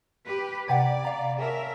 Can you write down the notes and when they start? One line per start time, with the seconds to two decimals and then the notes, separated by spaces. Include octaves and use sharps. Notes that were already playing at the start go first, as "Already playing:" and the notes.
0.25 G4 B4
0.68 C3 D5 F#5 G5 A#5 G#6 D#7
1.05 F5 A#5 B5 B6
1.38 G#4 A#4 C#5 E5 A5